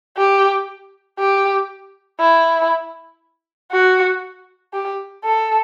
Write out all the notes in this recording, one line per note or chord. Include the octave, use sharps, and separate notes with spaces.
G4
G4
E4
F#4
G4
A4